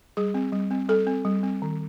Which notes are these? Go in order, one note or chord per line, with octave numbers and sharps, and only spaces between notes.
G3 G#4
C4
G3
C4
G3 A4
C4
G3
C4
D#3